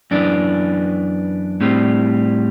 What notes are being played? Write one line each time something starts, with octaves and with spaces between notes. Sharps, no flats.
F#2 E3 B3 D4
A2 G3 C4